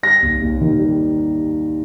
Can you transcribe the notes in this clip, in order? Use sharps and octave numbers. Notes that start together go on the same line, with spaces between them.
G3 A#6
D#2
D#2
D#3
G3